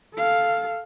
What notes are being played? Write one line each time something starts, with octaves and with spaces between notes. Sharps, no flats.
A4 F5